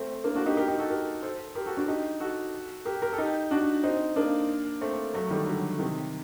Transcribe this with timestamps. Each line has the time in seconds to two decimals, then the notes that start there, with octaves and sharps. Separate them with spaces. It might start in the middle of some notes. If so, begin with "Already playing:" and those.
Already playing: A3 C4
0.24 A#3 D4
0.35 D4 F#4
0.46 D#4 G4
0.57 G4 A#4
0.68 D#4 G4
0.79 F#4 A4
0.90 G4 A#4
1.22 A4 C5
1.55 G4 A#4
1.66 F#4 A4
1.77 D4 F#4
1.88 D#4 G4
2.20 F#4 A4
2.85 G4 A#4
3.02 G4 A#4
3.13 A4
3.18 D#4 G4
3.51 D4 F#4
3.83 C4 D#4
4.16 A#3 D4
4.81 A3 C4
5.14 F#3 A3
5.30 D#3 G3
5.46 D3 F#3
5.79 C3 D#3